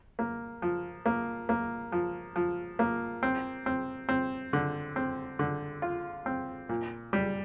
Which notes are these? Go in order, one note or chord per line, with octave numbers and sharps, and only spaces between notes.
A#3
F3
A#3
A#3
F3
F3
A#3
C4
C4
C4
D3
C4
D3
F4
C4
A#2
G3